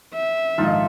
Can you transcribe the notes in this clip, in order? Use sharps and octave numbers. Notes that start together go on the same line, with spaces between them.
E5
A#1 G#2 D#3 D#4 F4 A4